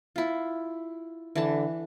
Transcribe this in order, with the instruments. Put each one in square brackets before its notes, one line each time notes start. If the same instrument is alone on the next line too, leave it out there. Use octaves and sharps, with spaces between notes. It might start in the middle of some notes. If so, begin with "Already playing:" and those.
[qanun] E4 F4
[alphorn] D3 [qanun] E3 D4 A5